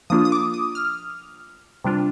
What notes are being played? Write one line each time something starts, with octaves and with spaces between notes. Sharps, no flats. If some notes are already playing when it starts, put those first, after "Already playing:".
F3 A#3 D4 F4 D#6
D#6
D6
D#6
F6
C3 G3 D4 F4